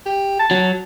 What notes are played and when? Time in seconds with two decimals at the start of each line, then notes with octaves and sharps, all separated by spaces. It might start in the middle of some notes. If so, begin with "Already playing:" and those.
0.06 G4
0.39 A5
0.51 F#3